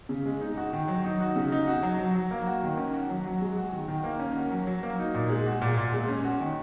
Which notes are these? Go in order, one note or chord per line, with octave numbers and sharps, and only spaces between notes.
C#3
G#3
D#4
F#4
D#3
F#3
D#4
F#4
C#3
D#4
F#4
F#3
F#3
F#3
A#3
F#4
D#3
C#4
F#4
F#3
F#3
G#3
F#4
D#3
D#3
A#3
C#4
F#4
F#3
F#3
A#3
D#4
A#2
G#3
F#4
A#2
A#2
G#3
C#4
F#4
D#3